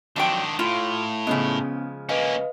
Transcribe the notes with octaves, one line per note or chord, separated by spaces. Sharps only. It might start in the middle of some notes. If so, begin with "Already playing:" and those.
F2 D#3 F#3 D4 G5
A2 F4 F5
C#3 F3 G#3 B3 C#4
A#3 C#4 B4 D#5 F5